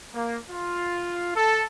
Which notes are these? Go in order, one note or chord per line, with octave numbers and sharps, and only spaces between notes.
A#3
F4
A4